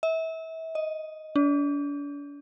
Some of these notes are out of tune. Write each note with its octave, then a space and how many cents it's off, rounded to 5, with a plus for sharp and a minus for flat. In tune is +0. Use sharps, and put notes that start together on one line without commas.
E5 -30
D#5 +5
D4 -40